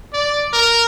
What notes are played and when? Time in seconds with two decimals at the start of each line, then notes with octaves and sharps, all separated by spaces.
0.13 D5
0.53 A#4